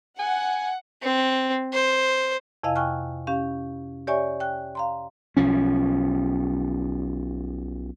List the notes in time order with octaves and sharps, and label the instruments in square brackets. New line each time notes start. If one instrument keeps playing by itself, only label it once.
[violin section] F#5 [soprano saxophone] G#5
[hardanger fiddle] C4
C5
[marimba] F2 C3 E4 D#5 F5 G#5
G5 G#5 C#6 F6 F#6
C#4 G4 F5
G4 C#5 D5 E5 G#5 C#6
G5 F#6
F5 A#5 C6
[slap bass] B1 F3 C#4